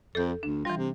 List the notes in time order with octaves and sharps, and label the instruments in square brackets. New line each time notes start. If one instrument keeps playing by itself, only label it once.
[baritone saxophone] F2 [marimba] A4 G6
[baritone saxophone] D2 [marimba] D4
[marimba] E3 G3 [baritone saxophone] F4
[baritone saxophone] C3